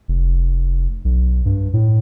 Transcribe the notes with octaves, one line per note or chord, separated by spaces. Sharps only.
F1
B1
G2
A2